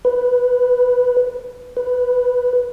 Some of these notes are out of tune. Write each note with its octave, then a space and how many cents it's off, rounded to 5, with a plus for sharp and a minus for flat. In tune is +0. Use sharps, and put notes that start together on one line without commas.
B4 +0
B4 +0